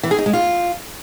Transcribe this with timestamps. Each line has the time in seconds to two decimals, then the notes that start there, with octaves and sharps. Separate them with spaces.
0.03 E3
0.11 G#4
0.18 D#4
0.26 G#3
0.33 F4